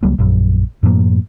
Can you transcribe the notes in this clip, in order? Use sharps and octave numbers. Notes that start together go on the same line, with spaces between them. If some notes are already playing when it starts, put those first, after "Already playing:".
C#2 F#3 G3 A#3
A#1 F#2
F#2 A2 F3 A#3